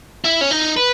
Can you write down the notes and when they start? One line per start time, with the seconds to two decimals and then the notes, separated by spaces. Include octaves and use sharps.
0.24 E4
0.41 C#4
0.51 D#4
0.77 B4